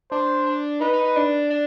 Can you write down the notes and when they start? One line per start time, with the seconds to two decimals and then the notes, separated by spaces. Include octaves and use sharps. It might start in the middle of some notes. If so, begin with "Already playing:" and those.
0.11 D4 C5
0.46 D4
0.81 D#4 B4
0.93 D#4
1.04 D#4
1.16 D4
1.50 D4